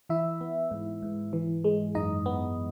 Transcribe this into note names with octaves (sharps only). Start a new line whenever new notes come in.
E3 E4 E5
B3
G#2
G#2
E3
G#3
F#2 D#4 D#5
B3